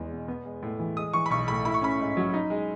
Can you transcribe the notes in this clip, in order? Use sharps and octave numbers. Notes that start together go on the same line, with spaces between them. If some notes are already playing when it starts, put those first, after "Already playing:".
Already playing: E2 G#3
B2
B3
G#3
A2
E3
G#3 D#6
E3 C#6
B5
B1 C#6
A2 B5
E4 B5
C#6
C#4 B5
G#2
F#3
D#4
G#3